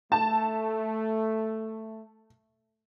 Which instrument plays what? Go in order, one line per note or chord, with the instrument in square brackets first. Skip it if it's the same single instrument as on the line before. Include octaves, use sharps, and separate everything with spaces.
[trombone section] A3 [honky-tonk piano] A5